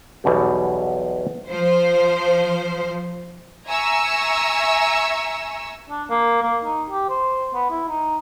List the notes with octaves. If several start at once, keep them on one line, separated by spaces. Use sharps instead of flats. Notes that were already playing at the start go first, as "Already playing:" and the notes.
B1 E2 B2 G3
F3 C5
E5 G#5 A#5 C#6 E6
D4
A#3
A#3
D#4
G4
C5
B3
E4
D#4